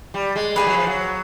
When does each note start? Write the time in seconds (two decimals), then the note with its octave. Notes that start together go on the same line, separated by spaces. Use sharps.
0.14 G3
0.36 G#3
0.56 G3 E4 G#4 B4
0.66 F#3
0.77 F3
0.87 F#3